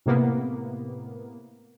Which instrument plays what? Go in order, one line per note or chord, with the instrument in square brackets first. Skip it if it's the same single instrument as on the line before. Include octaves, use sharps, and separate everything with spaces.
[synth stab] A2 C3 A#3 B3